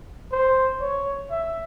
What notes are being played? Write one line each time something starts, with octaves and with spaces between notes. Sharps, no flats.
C5
C#5
E5